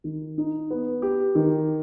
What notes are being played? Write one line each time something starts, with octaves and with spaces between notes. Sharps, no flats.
D#3
D#4
B3
G4
D#3